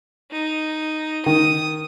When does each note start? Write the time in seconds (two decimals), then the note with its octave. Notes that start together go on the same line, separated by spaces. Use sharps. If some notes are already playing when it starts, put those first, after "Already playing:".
0.32 D#4
1.26 D#3 D#6